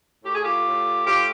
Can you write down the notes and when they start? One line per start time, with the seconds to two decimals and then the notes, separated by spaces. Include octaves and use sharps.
0.24 A2 G4
0.35 G#4
0.44 F4 G4
0.66 A2
1.06 A2 F4 G4